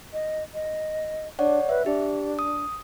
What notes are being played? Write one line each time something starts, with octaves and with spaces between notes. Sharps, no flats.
D#5
D#5
D4 C#5 D5 F#5
B4 E5
D4 G4
D#6